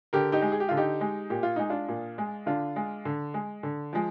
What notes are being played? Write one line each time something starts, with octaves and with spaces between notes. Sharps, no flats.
D3 G4 A#4
D#4 G4
G#3
G#4
G4
D3 F4
D#4 G4
G#3
A#2 G4
F4
G#3 D#4
D4 F4
A#2
G#3
D3 D4 F4
G#3
D3
G#3
D3
F3 G#3